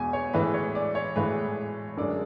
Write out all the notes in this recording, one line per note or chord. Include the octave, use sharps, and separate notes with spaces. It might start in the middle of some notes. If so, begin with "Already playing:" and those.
Already playing: E2 B2 G#3 G#5
C#5
A2 E3 G#3 B4
C#5
D5
C#5
A2 E3 G#3 B4
F#2 D3 G#3 D5